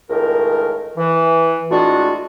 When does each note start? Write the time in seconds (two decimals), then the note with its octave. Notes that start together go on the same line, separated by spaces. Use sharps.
0.10 C#2 A2 D#3 A#4
0.98 E3
1.71 A2 G#3 D4 F4 F#4